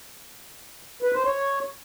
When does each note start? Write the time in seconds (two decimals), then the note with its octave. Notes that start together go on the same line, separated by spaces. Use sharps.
1.03 B4
1.14 C5
1.25 C#5